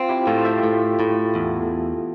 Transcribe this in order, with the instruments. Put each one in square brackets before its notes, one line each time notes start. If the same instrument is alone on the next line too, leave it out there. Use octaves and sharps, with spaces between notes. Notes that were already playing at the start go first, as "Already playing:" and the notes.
Already playing: [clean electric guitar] C4 [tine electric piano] F4
[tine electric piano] E4 G4
[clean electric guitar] A2 [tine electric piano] F4 A4
[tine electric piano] A5
E5 G5
[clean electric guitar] A2
A2
E2